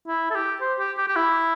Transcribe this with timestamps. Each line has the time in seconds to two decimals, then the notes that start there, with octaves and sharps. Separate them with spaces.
0.07 E4
0.30 A4
0.35 G4
0.61 C5
0.79 G4
0.97 G4
1.08 G4
1.16 E4